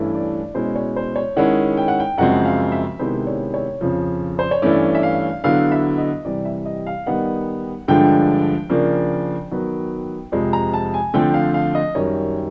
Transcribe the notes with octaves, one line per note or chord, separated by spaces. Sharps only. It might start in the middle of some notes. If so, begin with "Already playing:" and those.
Already playing: G2 E3 A3 C#4 E4
D5
B2 G#3 C#4 E4 C5
C#5
C5
C#5
D#3 G#3 C#4 E4 F#5
G5
F#5
G5
F#2 C#3 F3 G#3 C4 F#5
F5
E5
C3 D#3 G#3 B3 E4 C5
C#5
C#5
F2 C#3 F3
C5
C#5
G2 E3 A3 C#4 E4 D5
E5
F5
D3 F#3 B3 E4 F5
E5
D#5
C3 E3 G3 D5
E5
D#5
F5
D#3 G3 B3 D#4 F#5
G2 D3 F3 G#3 G5
C#3 F3 A#3 D4
D#3 F#3 B3
F2 C3 F3 G#3
A#5
A5
G#5
D3 F3 A3 C4 G5
F5
F5
D#5
F#2 D#3 G3 C#5